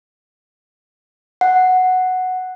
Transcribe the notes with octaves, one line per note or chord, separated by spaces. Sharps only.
F#5